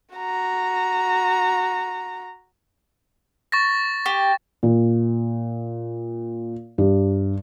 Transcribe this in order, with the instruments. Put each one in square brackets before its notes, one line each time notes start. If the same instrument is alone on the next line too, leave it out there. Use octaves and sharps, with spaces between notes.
[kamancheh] F#4 A#5
[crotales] C#6 A6 A#6
[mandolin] G4 [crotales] C#6
[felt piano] A#2
G2